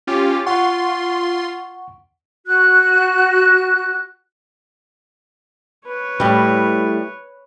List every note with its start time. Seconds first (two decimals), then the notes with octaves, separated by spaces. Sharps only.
0.07 C#4 F4 G4
0.46 F4 F#5 C6 C#6
2.46 F#4 F#6
5.87 B4 C#5
6.20 A2 G3